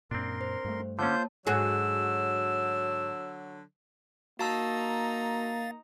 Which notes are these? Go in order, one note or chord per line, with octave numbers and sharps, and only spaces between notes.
F#2 A#2 C4 D4 A#4 C6
C5
G2 A3
D3 A#3 C#4 F4 C5 C#5 A5 G6
G#2 D3 F#3 F#4 G#4 E6
A#3 D#4 F#4 F5 A5 A#5 E6 A6